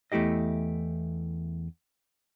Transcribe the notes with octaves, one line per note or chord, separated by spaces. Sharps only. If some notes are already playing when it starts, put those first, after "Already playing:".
E2 A3 E4 G4 D#5